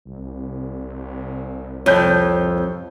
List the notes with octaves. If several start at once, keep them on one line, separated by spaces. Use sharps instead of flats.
C2
F2 C#5 G6